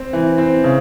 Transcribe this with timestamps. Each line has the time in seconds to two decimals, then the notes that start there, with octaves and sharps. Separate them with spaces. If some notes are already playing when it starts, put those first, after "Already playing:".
Already playing: C4
0.13 E3
0.38 C4
0.64 C#3